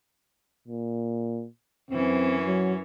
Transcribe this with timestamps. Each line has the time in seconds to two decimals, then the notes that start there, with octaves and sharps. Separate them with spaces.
0.68 A#2
1.91 F#2 E3 C4 C#4
2.46 F#3